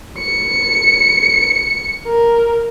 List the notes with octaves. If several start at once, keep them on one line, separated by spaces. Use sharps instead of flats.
C#7
A#4